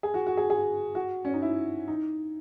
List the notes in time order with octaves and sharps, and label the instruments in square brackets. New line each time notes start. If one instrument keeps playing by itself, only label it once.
[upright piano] G#4
F#4
F#4
G#4
G#4
F#4
C#4
D#4
E4
D#4